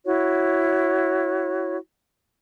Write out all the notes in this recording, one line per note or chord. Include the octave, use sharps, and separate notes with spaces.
E4 F#4 C#5